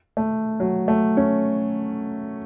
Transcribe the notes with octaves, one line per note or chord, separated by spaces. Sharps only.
A3
F#3
A3
C#4